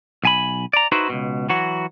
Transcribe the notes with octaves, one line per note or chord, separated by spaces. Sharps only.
B1 G#5 B5
D5 A#5
D#4 E4 F#4 B4 C5
C#2 B2
E3 F#3 F#4